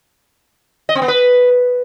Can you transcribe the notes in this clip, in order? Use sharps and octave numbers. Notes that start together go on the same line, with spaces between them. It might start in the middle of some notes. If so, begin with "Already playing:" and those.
D#5
C4
B3
B4